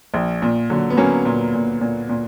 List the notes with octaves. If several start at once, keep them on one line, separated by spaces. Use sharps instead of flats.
A#1
A#2
A#2 D3 F#3
B3
F#3 A#3 C#4
A#2
A#2
A#2
A#2